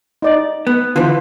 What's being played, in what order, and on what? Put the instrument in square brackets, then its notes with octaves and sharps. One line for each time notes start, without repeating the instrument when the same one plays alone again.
[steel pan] D#4 D5
[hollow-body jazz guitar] B3
[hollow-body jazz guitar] D3 E3 [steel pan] F4 B4 C5